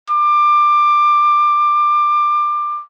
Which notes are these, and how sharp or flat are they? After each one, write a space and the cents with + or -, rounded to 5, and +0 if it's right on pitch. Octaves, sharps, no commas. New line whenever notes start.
D6 +20